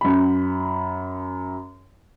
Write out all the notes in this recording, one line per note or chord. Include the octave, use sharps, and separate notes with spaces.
F#2 B5